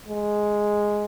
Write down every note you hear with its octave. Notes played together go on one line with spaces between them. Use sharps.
G#3